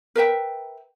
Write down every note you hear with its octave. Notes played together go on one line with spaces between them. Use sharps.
A#4 B4 E5 G5